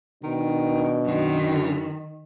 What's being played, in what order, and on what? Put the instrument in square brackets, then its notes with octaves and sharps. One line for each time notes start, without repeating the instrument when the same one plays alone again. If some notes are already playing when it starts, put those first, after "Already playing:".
[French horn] B2 [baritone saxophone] D#3 [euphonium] D4
[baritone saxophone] F#2 [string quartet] D#3